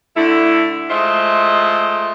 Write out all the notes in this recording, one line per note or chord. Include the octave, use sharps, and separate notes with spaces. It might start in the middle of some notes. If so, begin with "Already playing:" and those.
D3 A3 E4
G#3 A3 F4 C5 D#5 E5